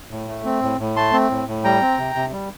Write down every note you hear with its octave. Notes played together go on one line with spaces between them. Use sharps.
A2
A3
C4
A2
A2
A3 A5 C6
C4
A2
A2
G3 G5 A#5
C4
C3
C3
G3